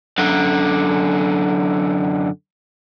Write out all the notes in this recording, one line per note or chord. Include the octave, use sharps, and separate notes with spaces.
F#2 D3